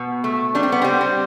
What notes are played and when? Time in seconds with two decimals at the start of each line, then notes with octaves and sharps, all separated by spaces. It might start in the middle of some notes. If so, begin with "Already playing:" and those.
Already playing: B2 B3
0.24 A3
0.55 G3 D4
0.63 C4
0.72 B3
0.82 G3 C4
1.01 C4